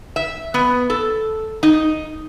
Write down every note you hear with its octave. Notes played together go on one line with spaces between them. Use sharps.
E5
B3
A4
D#4